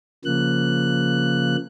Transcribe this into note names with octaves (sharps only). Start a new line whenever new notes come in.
C#3 F3 A#3 F#6